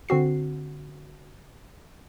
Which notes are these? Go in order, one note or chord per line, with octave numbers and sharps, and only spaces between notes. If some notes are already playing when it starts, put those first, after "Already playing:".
D3 C4 F#4 C7